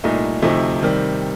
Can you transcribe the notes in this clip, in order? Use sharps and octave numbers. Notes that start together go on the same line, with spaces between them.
C2 A#2 A3 D#4
D2 C3 F3 A3 D#4
C3 D#3 G3